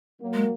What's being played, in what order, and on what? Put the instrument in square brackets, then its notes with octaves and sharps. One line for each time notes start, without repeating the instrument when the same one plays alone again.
[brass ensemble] F#3 A#3
[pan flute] G#3